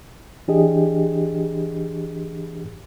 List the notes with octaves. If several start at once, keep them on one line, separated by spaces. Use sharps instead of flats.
E3 D4 G4 G#4 D#5